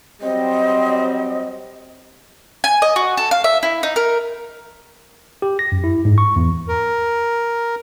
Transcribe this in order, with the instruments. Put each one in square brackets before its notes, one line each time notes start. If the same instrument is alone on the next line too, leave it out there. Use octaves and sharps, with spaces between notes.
[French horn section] F#3 G3 C4 [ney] D#5
[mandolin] G#5
D#5
F#4
A4
F5
E5
E4
D#4
A#4
[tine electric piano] G4
A#6
F#2
E4
G#2
C#6
E2
[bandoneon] A#4